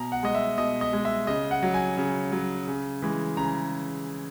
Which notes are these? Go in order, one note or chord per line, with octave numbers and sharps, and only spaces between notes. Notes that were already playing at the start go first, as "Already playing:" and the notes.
Already playing: B2 A#5
F#5
G#3 D#5
E5
B2 D#5
D#5
G#3
E5
C#3 D#5
F#5
F#3
G#5
C#3
F#3
C#3
E3 G#3
C#3 A#5